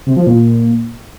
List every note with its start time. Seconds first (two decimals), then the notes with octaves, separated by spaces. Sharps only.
0.06 C3
0.16 F3
0.27 A#2